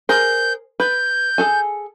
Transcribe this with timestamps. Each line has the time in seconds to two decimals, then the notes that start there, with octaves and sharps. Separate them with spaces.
0.09 G#4 A#4 C5 G6
0.80 B4 G6
1.38 G#4 A4 G#5